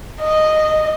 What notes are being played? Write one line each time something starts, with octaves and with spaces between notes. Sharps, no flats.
D#5